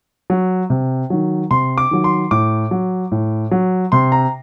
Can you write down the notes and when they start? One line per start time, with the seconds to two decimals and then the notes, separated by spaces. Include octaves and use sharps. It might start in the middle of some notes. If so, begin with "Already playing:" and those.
0.30 F#3
0.70 C3
1.10 D#3 F#3
1.51 C3 C6
1.78 D6
1.91 D#3 F#3
2.04 C6
2.31 A2 D6
2.71 F#3
3.12 A2
3.51 F#3
3.92 C3 C6
4.12 A#5